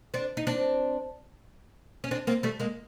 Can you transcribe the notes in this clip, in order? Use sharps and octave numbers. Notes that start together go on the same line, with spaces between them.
C4 D4
D#4
C4 D4
C#4
C4 D4
A#3 C4
G3 A3
G#3 A#3